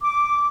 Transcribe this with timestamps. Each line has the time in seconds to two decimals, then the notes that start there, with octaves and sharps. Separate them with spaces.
0.01 D6